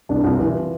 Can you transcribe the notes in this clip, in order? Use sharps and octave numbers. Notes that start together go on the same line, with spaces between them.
C2 D4
C2 F4
E3